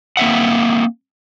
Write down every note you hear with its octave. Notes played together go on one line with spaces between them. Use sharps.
A#3 C4 E5 F#5